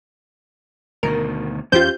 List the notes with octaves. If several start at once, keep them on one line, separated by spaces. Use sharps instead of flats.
D2 B2 D#3 A#4
E2 E3 C#4 F4 G4 C5 G6